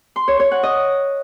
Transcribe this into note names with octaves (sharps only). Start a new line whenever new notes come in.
C6
C#5
C#5
F#5
D#5